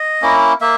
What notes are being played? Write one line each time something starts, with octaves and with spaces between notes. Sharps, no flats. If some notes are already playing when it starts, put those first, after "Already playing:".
Already playing: D#5
A#3 C#4 E4
A#3 E5